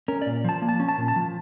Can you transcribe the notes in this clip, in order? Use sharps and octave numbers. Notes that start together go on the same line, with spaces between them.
C#4 A#4
A#2 D5
F3 A5
A#3
A5
C#4
A5
A#2
A5
F3